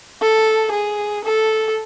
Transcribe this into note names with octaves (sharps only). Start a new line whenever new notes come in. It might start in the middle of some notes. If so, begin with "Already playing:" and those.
A4
G#4
A4